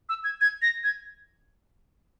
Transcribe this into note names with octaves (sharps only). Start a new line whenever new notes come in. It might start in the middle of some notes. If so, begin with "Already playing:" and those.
E6
G#6
G#6
A#6
G#6